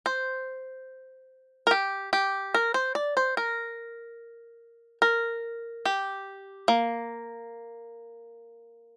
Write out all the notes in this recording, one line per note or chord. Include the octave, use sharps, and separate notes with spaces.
C5
A#4
G4
G4
A#4
C5
D5
C5
A#4
A#4
G4
A#3